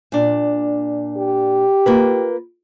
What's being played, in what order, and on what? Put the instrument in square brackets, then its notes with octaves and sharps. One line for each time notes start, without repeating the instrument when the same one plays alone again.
[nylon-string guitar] A#2 D4
[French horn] G4
[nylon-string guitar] A#3 F4 B4